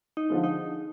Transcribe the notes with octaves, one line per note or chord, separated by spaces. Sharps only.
D#4
D3 F3 G#3
D#4